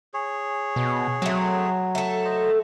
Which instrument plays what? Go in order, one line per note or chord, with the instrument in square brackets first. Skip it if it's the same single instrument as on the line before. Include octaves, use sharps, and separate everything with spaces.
[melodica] G#4 C#5
[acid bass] B2
[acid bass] F#3 [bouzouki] A3 C4
[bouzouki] A3 A4
[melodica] C5 D#5